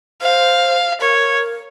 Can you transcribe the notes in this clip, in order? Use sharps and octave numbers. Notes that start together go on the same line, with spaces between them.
C5 F5
A#4 C#5